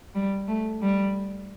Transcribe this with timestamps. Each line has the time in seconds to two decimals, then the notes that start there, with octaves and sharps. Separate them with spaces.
0.15 G3
0.48 A3
0.81 G3